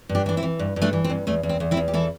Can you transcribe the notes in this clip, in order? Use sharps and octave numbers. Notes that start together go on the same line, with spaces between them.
G2
D4 G4
E3 D4
C4 E4
E3
G2
G2
A3 D4
E3
C4
G2
E2 A3
E2
C4
E2
C4 E4
E2
G4
E3 E4 A4